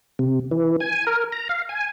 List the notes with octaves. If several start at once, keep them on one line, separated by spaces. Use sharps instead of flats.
C3
E3
G#5
A#4
A#5
F5
G#5